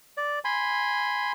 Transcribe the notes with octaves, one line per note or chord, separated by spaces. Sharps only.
D5
G#5 B5 C6